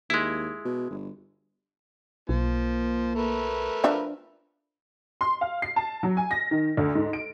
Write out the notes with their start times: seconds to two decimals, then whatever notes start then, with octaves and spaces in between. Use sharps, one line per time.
0.10 D#2 G#3 E4
0.65 B2
0.90 G1
2.29 B1 F3 A#3
3.15 A3 A#4 B4
3.84 F3 D4 E5
5.21 C6
5.41 F5
5.62 C7
5.76 A5
6.03 F#3
6.17 G#5
6.31 A#6
6.51 D#3
6.77 D2
6.95 G#2
7.13 D7